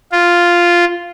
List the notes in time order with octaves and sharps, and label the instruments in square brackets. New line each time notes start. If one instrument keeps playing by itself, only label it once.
[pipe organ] F4